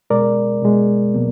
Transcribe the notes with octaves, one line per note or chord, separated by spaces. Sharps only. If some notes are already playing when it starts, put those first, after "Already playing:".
B2 G#3 A#4 D5
B2 G#3
B2 F#3 A#3